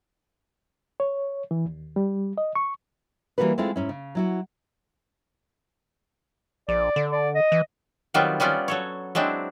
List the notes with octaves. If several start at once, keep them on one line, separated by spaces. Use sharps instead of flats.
C#5
E3
D#2
G3
D#5
C#6
E3 F3 G3 A#3 F#4 B4
G#3 A3 C4 E4 F4
G#2 C#4 E4
C#3
F#3 E4 F#4
A#1 D5
D3
D5
D#5
E3
D#3 F#3 G3 B3 C4 F4
G3 B3 C#4 F4 D5
F#3 A4 C#5
F#3 G#3 C4 D4 E4